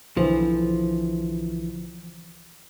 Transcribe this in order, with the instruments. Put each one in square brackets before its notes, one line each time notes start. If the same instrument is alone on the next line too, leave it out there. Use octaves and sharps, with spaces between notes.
[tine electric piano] B1 D3 E3 [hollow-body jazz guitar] F3